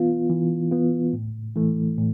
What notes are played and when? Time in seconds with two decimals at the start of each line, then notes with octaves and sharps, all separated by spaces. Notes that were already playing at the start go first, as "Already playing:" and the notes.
Already playing: E3 B3 F4
0.30 E3
0.71 B3 F4
1.13 A2
1.56 E3 A3
1.98 A2